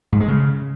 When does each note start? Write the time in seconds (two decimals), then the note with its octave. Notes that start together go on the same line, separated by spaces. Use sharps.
0.12 G#2
0.20 G#3
0.28 C#3